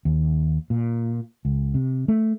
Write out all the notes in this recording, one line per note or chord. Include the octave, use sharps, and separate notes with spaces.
D#2
A#2
C#2
C3
A3